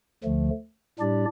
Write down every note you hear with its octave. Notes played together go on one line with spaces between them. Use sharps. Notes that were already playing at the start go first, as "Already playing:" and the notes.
D2 D3 F3 A3
A2 G3 D4 G4 D5